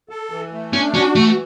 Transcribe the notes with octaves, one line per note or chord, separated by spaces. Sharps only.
A4
E3
A3
C#4 D4
C#4 F#4
E3 A3